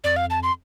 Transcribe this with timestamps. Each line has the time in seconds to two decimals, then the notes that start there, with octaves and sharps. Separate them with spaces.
0.04 F2 D5
0.16 F5
0.30 A5
0.43 C6